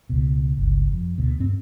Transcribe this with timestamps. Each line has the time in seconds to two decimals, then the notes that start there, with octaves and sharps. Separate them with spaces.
0.09 C#2 B2
0.57 G1 C#2
0.92 F2
1.18 D2 B2
1.39 G2 C4